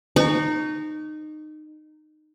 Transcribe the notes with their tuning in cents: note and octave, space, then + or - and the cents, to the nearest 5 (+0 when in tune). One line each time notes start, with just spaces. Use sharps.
D#4 -20 C#6 +30